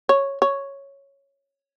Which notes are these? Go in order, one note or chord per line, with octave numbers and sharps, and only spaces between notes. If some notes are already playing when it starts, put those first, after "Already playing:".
C#5
C#5